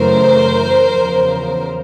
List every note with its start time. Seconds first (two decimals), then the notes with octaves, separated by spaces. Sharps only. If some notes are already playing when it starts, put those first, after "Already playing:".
Already playing: F#2 C#3 E3 A3 A#4 C5
0.90 E2 C#3 F3